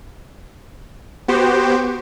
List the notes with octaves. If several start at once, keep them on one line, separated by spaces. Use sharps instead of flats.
B3 F#4 G4 C5